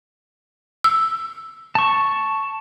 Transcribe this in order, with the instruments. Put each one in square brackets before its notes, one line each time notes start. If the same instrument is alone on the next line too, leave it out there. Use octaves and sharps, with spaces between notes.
[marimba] E6
[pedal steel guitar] A5 C#6